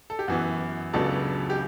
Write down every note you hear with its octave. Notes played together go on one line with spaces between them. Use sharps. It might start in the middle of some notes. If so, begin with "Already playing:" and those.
A4
G4
F#2 E3 B3 F#4
C#2 C#3 F#3 B3 D4 A4
G4